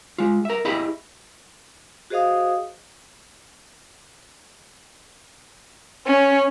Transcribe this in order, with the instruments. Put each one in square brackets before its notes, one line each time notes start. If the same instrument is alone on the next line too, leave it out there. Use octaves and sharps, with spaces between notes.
[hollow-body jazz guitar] G#3 F4
A#4 E5
E4 G4 G#4 D#5 E5 B5
[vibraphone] F#4 G#4 C5 D#5 F5 D#6
[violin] C#4